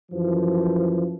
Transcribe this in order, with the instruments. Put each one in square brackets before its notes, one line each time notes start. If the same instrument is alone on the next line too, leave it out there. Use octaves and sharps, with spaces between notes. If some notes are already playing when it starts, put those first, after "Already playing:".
[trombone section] F#2 E3 F3